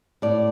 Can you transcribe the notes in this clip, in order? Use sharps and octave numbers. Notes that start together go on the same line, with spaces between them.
A2 D5